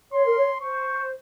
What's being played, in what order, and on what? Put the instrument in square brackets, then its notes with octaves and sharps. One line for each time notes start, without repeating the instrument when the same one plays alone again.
[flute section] C#5 [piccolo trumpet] C6
[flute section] A#4
C#5
[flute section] C5 [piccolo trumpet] C#6